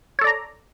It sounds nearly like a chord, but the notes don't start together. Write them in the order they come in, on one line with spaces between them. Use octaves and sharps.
C#5 A4 D5 A#5